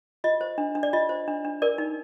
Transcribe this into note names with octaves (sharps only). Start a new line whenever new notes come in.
F4 D#5
C5
D4
D4
D5
F4 D#5
C5
D4
D4
A#4 D5
D#4